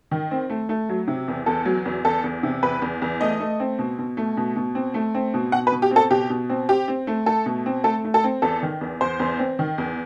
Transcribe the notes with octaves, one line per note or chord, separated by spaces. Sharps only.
D#3
C4
A3
A3
F#3
C3
E2
E2 A4
F#3
E2
E2 A4
E2
C3
E2 B4
E2
E2
A3 D#5
A3
C4
B2
B2
A3
B2
B2
C4
A3
C4
B2
B2 F#5
B4
B2
G4
C4 A4
B2 G4
B2
C4
C4 G4
C4
A3
A3 A4
B2
C4
A3 A4
A3
A4
C4
E2 A4
D#3
E2
E2 C5
E2
C4
D#3
E2